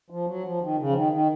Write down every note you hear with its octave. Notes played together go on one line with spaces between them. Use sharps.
F3
F#3
F3
D#3
C#3
F3
D#3
D#3